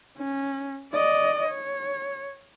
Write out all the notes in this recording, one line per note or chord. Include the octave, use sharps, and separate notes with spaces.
C#4
D5 D#5
C#5